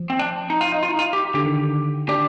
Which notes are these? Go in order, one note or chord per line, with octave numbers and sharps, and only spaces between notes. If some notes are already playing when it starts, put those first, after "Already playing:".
Already playing: F3
C4
D4
D#4
F4
D#4
F4
D#4
F4
G4
D3 G4
D#3
D4 G4